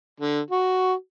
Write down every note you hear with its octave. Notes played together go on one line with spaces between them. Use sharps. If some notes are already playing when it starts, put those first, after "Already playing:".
D3
F#4